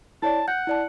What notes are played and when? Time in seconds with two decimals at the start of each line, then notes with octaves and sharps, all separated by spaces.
0.22 E4 C#5 D5 A5
0.48 F#5 G6
0.67 E4 D5 A5